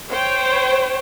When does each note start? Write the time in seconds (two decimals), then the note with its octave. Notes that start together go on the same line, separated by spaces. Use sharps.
0.11 C5 C#5 G5